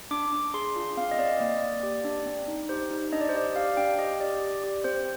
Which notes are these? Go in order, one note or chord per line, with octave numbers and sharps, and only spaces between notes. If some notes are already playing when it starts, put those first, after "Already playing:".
D4 D6
D4
G#4 C6
F4
C4 F5
D#5
C4 D5
D#5
A#3 D5
A#3
G4
D4
C4
D#4
G4 C5
D#4
D4 D#5
D5
C5
G4 D5
G4 F5
D4 G5
G4 D#5
G4 D5
G4
G4
C4 C5